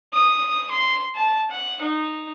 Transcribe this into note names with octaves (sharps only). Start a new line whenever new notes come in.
D#6
C6
A5
F#5
D#4